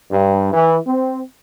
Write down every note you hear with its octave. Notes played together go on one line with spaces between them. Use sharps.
G2
E3
C4